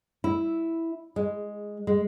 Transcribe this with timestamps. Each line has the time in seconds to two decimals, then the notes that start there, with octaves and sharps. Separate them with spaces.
0.24 E4
1.16 G#3
1.87 G#3